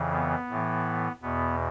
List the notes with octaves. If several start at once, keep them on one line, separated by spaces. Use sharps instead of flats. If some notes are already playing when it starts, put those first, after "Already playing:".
Already playing: F2 C#3 E3
B3
A2 E3
E2 B2 B3